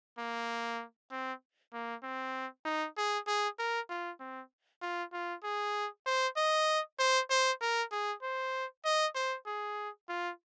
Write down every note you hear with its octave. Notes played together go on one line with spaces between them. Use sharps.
A#3
C4
A#3
C4
D#4
G#4
G#4
A#4
F4
C4
F4
F4
G#4
C5
D#5
C5
C5
A#4
G#4
C5
D#5
C5
G#4
F4